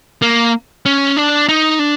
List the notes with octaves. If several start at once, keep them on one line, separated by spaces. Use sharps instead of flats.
A#3
C#4
D4
D#4
D4